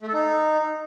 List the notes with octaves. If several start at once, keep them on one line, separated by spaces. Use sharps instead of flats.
A3
A4
D#4